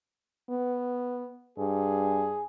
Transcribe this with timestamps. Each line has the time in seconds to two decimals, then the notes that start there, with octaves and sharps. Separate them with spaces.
0.50 B3
1.58 G2 G#4